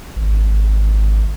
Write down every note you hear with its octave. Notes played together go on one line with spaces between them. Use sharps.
G#1